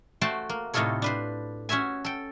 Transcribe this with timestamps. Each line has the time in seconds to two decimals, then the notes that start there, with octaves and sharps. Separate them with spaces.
0.21 A3 F#4 C5 G5 A5
0.49 A#3
0.74 A2 C3 D#4 F4 A4 C#5
1.02 D4 B4 C5
1.69 C#4 F#4 C#5 E5 G#5
2.05 A4 G5